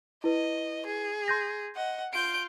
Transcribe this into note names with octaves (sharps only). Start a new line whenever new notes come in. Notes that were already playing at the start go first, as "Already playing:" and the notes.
E4 B4 D#5
G#4
C6 G6 A#6
D#5 F#5
F4 G6 D7